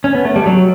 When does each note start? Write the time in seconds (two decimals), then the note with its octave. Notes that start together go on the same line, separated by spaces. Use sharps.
0.04 C#4
0.15 B3
0.25 A3
0.36 G3
0.46 F#3